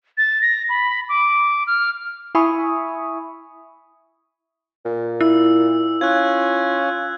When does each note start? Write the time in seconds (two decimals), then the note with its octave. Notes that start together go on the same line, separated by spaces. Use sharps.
0.18 A6
0.42 A#6
0.69 B5
1.09 D6
1.67 F6
2.35 E4 E5 G#5 B5 C#6 D#6
4.85 A#2
5.21 E4 E6
6.01 C#4 F4 F#6 G#6